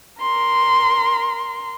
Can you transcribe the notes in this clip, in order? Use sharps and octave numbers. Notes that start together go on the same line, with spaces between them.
A#4 C6